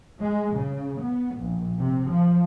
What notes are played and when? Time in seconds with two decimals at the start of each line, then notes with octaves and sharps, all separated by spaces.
0.22 G#3
0.57 C#3
1.02 B3
1.37 A#1
1.80 C3
2.10 F3